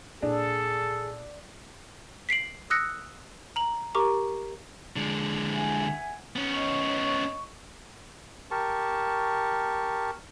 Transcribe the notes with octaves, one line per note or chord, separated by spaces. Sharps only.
A#2 D4 G#4 A4
B6 C7 D7 F#7
D#6 E6 F#6 A#6 C#7
A#5 F#7
G4 A#4 A#5 C#6 D6
D3 G#3
E5 F#5 G#5
B3 C#4
C#5 D#5 C#6
G4 A#4 A5 C#6